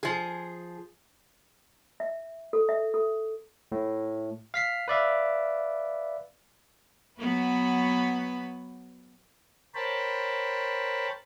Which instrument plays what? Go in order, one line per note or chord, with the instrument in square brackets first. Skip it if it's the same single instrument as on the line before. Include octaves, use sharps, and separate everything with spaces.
[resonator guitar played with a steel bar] F3 G#4
[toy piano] E5
A4
E5
A4
[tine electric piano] A2
F5 B6 C7
B4 D5 E5 F5
[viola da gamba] F#3 B3 B4
[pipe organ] A#4 C5 C#5 G5 A5 B5